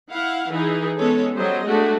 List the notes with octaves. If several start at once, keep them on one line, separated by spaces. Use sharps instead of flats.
E4 F5 F#5
E3 D#4 G#4
G#3 B3 C#4 A4 C#5
F#3 G3 C5 D#5
G#3 A3 D4 F#4